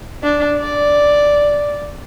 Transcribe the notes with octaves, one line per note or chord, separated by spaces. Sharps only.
D4
D5